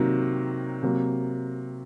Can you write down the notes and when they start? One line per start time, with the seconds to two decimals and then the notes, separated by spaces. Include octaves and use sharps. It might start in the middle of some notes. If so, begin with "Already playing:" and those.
Already playing: C3 D#3 F#3 A#3
0.83 C3 F#3 A#3